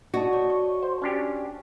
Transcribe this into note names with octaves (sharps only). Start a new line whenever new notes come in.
F#4 D5 D#5 A5
C#5 D5
C#6
C5
C#4 D4 G4